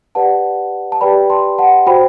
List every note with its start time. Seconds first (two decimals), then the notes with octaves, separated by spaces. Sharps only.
0.15 G4 B4 D5 F#5 A5
0.92 A5
1.01 G4 B4 D5 G5 B5
1.30 A5 C6
1.58 F#5 A5
1.86 F#4 C5 G5 B5